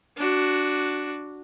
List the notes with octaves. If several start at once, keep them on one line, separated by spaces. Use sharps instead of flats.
D4 F#4